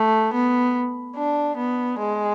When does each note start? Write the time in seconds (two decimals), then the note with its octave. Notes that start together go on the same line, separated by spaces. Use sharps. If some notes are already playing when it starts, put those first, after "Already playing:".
Already playing: A3
0.34 B3
1.17 D4
1.57 B3
1.99 G#3